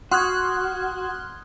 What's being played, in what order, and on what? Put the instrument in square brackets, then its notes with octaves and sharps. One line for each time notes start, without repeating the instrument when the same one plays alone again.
[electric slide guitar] F#4 [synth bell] F#5 D#6 G#6 [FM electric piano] C6 F6 F#6